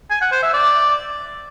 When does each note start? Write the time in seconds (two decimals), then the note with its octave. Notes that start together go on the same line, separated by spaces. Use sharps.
0.10 G#5
0.21 F#5
0.32 C5
0.43 E5
0.54 D5